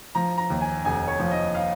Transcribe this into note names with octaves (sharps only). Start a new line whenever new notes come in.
F3 A#5
A#5
D#2
G#5
F1 G#5
C#5
F3
D#5
F5